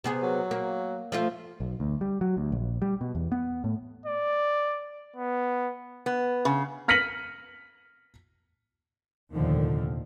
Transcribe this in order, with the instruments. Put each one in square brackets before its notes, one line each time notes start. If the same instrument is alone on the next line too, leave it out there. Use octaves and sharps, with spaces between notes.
[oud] C3 B3 G#4
[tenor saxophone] F#3
[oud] A#3
F3 A3 F4
[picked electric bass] B1
D2
G3
F#3
D2
A#1
G3
B2
E2
B3
A2
[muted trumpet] D5
B3
[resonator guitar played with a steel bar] B3
C#3
[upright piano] F6 A#6 B6 C#7 D#7 F#7
[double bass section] F1 D#2 A#2 D3 D#3 F3